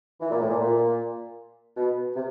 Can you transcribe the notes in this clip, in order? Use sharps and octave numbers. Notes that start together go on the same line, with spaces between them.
E3
A#2
A2
A#2
A#2
B2
C3